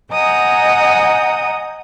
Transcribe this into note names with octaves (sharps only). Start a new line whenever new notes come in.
D#5 F#5 G#5 A#5 D#6 G6